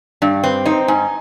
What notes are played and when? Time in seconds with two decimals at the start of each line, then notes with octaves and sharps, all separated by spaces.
0.22 G2 D4
0.43 C4 B4
0.66 D#4 C5
0.88 G#2 G#5